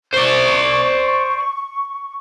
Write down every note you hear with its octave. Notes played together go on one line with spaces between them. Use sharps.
C5 D5 C#6